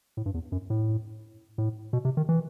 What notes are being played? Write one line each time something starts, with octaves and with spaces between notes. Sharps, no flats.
A2
G2
E2
F#2
A2
A2
B2
C3
D#3
E3